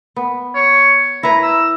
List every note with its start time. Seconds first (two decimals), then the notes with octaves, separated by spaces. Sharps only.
0.16 B3
0.55 C#5
1.23 E4 B4 A#5
1.43 E6